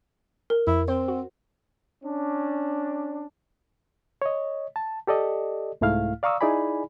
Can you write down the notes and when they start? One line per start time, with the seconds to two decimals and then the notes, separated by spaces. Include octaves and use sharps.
0.50 A#4
0.67 F2 E4
0.88 C4 C5
1.08 F#4
2.04 C#4 D4
4.22 C#5 D#5
4.76 A5
5.07 G4 A4 D5 D#5
5.81 C2 G#2 A3 E4 F5 F6
6.23 D5 F5 A#5 C#6 D#6 E6
6.41 D#4 E4 G#4 D5 G#5 B5